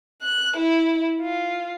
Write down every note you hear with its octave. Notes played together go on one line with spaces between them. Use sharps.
F#6
E4
F4